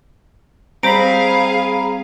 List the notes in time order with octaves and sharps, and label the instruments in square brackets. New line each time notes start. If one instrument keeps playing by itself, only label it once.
[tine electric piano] G3 C4 [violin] G#4 F5 [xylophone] C5 D7 [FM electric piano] A#5 B5